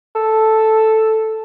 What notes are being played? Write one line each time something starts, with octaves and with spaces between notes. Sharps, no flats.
A4